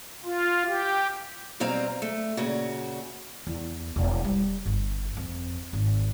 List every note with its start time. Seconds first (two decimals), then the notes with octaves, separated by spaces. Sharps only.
0.25 F4
0.67 G4
1.60 B2 F#3 G3 C4 F5 A#5
2.02 A3
2.37 A#2 C#3 F#4
3.47 E2
3.96 E1
4.24 G3
4.66 G1
5.17 F2
5.73 G#1